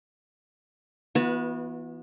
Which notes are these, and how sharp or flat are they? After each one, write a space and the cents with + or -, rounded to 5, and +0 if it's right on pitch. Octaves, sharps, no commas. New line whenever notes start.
E3 +0 B3 -20 F#4 -35